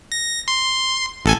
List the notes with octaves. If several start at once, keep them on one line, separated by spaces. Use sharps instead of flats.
A#6
C6
A1 A4 G#5